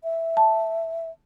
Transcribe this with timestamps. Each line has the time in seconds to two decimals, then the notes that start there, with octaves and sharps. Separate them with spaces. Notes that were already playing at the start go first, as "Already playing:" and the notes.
0.04 E5
0.37 A5